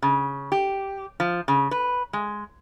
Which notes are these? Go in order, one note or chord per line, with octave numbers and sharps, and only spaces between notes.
C#3
G4
F3
C#3
B4
G#3